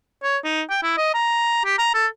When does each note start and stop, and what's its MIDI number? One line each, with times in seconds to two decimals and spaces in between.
0.23 0.38 73
0.44 0.62 63
0.70 0.80 79
0.83 0.97 64
0.97 1.11 75
1.14 1.63 82
1.65 1.77 67
1.79 1.91 82
1.94 2.07 69